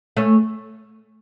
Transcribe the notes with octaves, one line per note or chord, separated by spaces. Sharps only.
A3 C#4